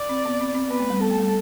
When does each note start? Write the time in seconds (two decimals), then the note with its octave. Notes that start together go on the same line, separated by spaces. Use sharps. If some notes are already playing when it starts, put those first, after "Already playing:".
Already playing: D5
0.09 C4
0.25 B3
0.41 C4
0.55 C4
0.70 B3 B4
0.80 A3
0.90 G3
1.00 B3 A4
1.10 A3
1.20 G3